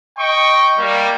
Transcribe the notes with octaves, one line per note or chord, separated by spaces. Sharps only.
D#5 G5 C#6
G3 A#3